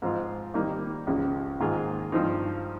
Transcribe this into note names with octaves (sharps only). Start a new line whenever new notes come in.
G#2 F3 C4 F4
D#3 G3 A#3 D#4 G4
C#2 C#3 F3 G#3
G#2 D#3 A#3 F4 G#4
G2 F3 C4 D#4